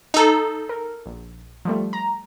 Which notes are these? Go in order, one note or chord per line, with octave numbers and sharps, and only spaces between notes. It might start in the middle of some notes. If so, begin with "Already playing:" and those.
D#4 A4
A#4
A#1
F3 G3 A3
A#5